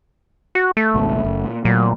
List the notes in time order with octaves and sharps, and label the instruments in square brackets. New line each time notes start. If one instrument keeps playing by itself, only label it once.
[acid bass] F#4
A3
[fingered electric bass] G#1 C#2 B2
F#1
A#2
[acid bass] A#2 [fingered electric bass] F#3 A3